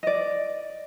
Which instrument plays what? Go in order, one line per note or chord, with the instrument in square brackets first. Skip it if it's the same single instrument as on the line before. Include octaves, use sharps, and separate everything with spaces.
[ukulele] D5 D#5